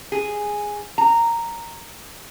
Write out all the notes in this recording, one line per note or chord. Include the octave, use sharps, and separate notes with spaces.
G#4
A#5